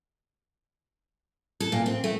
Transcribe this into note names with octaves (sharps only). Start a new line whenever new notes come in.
A4
A#2
C4
A3